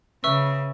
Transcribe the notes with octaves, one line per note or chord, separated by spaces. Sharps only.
C#3 B4 E5 C#6 E6